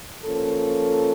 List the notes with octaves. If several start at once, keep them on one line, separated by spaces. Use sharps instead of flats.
F3 A#3 C#4 A4